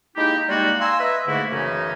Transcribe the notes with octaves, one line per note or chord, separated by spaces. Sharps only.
G#3 A#3 D#4 E4 G4
G3 G#3 A#3 D#4 F4 F#4
F5 G#5 A#5 C6 E6
B4 D#5 E5
G#2 D3 A3 A#3 E4 F#4
F#2 C#3 E3 A3 C#4 D#4